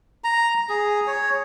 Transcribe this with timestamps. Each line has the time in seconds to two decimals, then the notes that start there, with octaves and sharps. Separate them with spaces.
0.24 A#5
0.69 G#4
1.07 C#5